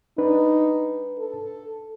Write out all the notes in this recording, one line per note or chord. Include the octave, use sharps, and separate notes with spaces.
D4 D#4 B4
A4